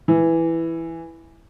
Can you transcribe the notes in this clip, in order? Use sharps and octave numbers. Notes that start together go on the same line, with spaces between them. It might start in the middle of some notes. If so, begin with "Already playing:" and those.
E3